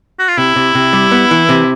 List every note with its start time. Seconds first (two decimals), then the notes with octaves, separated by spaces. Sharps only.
0.19 F#4
0.29 F4
0.38 C3 E4
0.56 C3
0.75 C3
0.93 G3
1.12 B3
1.31 E3
1.49 C3